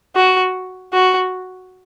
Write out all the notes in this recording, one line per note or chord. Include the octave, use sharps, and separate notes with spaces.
F#4
F#4